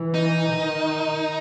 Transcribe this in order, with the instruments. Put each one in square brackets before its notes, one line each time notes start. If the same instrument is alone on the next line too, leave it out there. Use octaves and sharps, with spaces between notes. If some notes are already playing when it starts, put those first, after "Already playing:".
Already playing: [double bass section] E3
[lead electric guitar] D#4
[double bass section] D#3